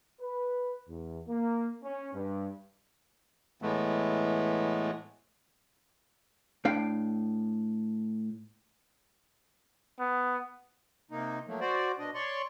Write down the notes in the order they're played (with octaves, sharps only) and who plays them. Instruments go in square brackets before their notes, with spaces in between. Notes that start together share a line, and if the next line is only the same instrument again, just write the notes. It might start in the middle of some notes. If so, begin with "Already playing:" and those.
[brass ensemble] B4
E2
A#3
C#4
G2
[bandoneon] A2 E3 G#3 A3 B3
[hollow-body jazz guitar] A2 D4 F5 G5
[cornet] B3
[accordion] C3 A#3 D#4
F3 F#3 A3 A#3
F#4 C5 D5
B2 D4 D#5
C#5 D5 C6 C#6